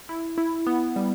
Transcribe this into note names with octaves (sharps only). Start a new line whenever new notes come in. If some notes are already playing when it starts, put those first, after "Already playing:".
E4
E4
B3
G3